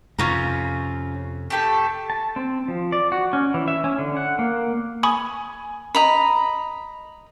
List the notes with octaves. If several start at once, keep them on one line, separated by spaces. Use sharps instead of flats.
F2 C3 C#4 F4 A#5
A3 G4 A4
A5
C4
F3
D5
F#4
C#4
E3
E5
C#4
D3
F#5
A#3
G#5 B5 C#6 D#6
D#5 A#5 B5